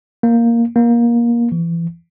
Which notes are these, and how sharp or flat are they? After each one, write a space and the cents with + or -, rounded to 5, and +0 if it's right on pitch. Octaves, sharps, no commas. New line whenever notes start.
A#3 +0
A#3 +20
E3 +30